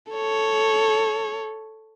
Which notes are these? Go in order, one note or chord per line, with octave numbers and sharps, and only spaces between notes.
A4 C#5